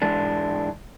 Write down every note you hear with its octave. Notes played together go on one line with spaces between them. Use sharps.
G#2 E3 G#3 D4